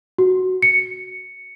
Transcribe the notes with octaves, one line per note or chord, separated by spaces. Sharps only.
F#4
C#7